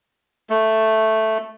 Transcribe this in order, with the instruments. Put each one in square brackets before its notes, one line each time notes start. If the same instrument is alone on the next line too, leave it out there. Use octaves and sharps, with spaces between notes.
[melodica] A3